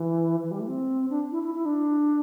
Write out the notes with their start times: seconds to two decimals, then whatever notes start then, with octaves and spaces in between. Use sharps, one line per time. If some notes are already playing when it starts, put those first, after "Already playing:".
Already playing: E3
0.43 E3
0.51 G3
0.60 A3
0.68 C4
1.10 D4
1.32 E4
1.43 E4
1.55 E4
1.66 D4